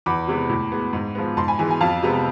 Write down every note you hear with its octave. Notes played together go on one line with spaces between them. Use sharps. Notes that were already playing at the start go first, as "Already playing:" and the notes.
E2 B5 D6
C3 E3 G#3 B3
A2
G#3 B3
G#2
F3 G#3 B3
G#2 A5 C6
G#5 B5
E3 G#3 B3 G#5
G#5
F2 F5 A5
C3 G#3 B3